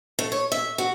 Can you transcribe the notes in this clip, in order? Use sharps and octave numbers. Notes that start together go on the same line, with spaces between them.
A3
C#5
E5
F#4